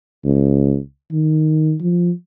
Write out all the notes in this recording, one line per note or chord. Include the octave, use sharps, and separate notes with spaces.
C#2
D#3
F3